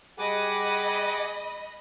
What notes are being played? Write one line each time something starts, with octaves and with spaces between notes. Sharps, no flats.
G3 G4 G#4 D#5 F#5 G#5 B5 D6